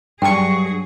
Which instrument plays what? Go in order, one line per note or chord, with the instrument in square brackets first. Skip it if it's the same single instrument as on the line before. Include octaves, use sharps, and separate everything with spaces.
[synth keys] G2 C#6 [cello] F#3 G#4 [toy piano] G5 A5